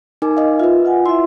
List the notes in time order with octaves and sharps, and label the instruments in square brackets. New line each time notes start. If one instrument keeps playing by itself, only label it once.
[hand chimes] D#4 A#4 G#5 [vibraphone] D6
[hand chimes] D#5 F5
[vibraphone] F4 [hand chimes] B4 E5
[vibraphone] F4 F#5 G#5
[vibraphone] E4 E5 [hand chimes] C6